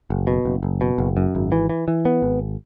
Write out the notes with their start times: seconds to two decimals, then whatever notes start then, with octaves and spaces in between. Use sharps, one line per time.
0.10 F#1
0.27 B2
0.45 F#1
0.63 F#1
0.81 B2
0.98 F#1
1.17 F#2
1.35 G#1
1.52 E3
1.70 E3
1.88 E3
2.05 B3
2.22 G#1